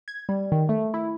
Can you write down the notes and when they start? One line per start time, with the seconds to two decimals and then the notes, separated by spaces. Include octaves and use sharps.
0.08 G#6
0.29 G3
0.52 D#3
0.69 A3
0.94 E4